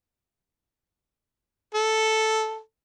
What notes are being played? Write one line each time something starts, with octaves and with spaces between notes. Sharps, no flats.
A4